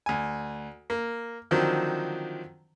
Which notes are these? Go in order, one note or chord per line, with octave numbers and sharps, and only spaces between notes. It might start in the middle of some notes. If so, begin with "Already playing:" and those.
D2 G#5
A#3
D3 D#3 F3 F#3 C4